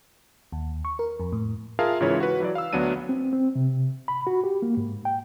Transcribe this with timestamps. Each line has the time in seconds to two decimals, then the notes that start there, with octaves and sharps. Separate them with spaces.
0.52 D#2
0.85 C#6
0.99 A#4
1.20 F2
1.33 A2
1.79 F4 G#4 A#4 E5 F5 A5
2.00 G#2 C#3 E3 E4 F4 C#5
2.20 F#4 B4
2.40 E3 F#3 D5
2.55 F5 E6
2.73 D2 F#3 B3 D4 D#7
3.09 C4
3.33 C4
3.55 C3
4.08 B5
4.27 F#4
4.44 G4
4.62 A#3
4.77 G#2
5.05 G5